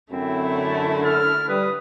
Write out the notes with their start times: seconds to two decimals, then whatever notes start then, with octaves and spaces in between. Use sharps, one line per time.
0.12 F#2 D3 A3 C4 E4
0.65 A5
1.04 A4 F6
1.49 G3 B4 D#6